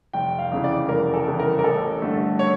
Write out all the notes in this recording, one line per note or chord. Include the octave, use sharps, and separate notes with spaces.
F1 G5
F5
E2 C#3 E3
D5
F1 A#4
A4
E2 C#3 E3
A#4
A#4
A1 A4
G2 D3 A3
C#5